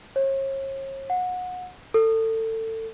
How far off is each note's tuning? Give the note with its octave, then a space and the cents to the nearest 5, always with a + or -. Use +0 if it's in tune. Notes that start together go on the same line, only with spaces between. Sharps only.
C#5 -40
F#5 -25
A4 +25